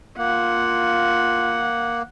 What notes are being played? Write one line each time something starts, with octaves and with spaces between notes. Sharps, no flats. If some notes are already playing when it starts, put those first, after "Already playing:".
A#3 F4 F#5